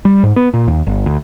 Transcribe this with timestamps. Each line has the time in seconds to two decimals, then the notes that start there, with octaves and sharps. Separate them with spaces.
0.05 G3
0.23 G#2
0.36 B3
0.54 A#2
0.68 D#2
0.87 G1
1.06 D2